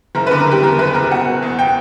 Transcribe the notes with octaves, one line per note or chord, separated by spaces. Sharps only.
F#1 A#4
B4
D3
A#4
F#1 G4
E2 A#4
F#1 B4
F#1 A#4
B2 F#5
B2
E2
G5